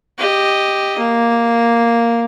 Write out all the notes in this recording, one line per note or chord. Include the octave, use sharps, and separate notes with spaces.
G4 D#5
A#3